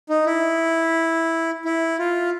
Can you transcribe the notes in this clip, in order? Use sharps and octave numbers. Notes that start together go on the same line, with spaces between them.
D#4
E4
E4
F4